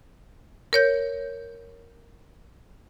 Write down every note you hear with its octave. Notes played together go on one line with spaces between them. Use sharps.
A#4 C#5 G6